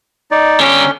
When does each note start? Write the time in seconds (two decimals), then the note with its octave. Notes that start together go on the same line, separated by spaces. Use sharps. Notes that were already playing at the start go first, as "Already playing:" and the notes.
0.31 D#4 D5
0.60 D3 C#4 G4